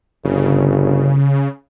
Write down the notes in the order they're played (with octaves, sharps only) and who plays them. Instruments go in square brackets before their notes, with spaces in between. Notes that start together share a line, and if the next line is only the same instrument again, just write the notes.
[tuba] G1 [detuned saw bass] C#3